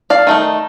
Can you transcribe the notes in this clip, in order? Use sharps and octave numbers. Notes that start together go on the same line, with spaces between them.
D5 F5
D#3 A3 D#4